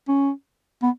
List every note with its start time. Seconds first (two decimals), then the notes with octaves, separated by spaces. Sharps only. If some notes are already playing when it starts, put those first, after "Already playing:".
0.08 C#4
0.82 B3